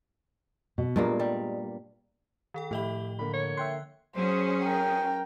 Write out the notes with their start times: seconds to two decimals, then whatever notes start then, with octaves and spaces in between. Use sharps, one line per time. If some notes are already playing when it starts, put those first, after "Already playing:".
0.78 B2
0.96 G2 A#2 G#3 A#3
1.20 G3
2.54 D#3 A4 G5
2.71 A2 F3 G4 D#5 E5 B5 G7
3.19 D3 A#3 B5
3.34 C#5
3.57 E5 G5 C6 F#6
4.16 F#3 C#4 G#4 C5
4.64 A#4 G5